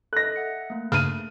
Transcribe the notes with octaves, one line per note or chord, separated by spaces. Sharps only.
A4 D#5 F#6 A#6
E5 F#5 C#7
A3 A#3
G2 C#3 F6 D#7